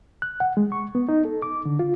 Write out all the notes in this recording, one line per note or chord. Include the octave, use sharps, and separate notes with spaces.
F#6
F#5
G#3
C#6
B3
D#4
A4
D6
D3
F4